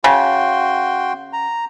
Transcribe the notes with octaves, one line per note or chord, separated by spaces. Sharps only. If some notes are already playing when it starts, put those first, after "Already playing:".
C#3 F#4 G5 C6
A#5